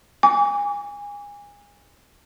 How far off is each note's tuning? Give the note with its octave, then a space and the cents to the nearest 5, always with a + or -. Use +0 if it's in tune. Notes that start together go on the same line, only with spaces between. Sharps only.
G#5 -25 D6 -40